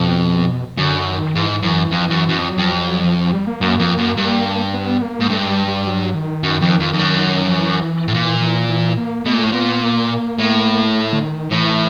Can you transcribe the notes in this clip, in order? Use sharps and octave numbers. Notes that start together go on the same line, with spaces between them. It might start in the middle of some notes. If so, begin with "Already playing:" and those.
Already playing: F2 B2
F#2 D3
D#3
G#2 E3
F#2
F2
F#2
F#2
F2
F#3
F2
F#3
F3
F3
G3
A#3
F#2
F2
F#2
G2
B3
A#3
G#2
G2 A3
G#3
G3
G3
F#3
D#3
F#2
F2
F2
F2
F#2
F3
E3
A2
A#2 E3
E3
E3
A#3
B2 A3
A#2
A2
A#2 B3
A#3
A2
A3
D3
D#3
A2 E3